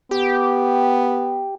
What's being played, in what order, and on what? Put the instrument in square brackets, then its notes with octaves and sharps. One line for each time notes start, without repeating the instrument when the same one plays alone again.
[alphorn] B3 [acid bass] G4